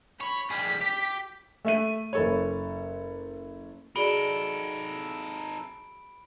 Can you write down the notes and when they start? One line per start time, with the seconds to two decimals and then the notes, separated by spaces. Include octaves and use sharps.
0.21 C#5 B5
0.51 G3 G#4 B6
0.81 G4
1.65 A3 E5 D#7
2.13 F#1 A4 C#5
3.96 D#4 F#4 G#4 A4 D5 B5 D7 G7